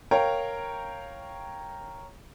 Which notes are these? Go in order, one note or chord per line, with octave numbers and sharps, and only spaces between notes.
A#4 C#5 F5 G5 A#5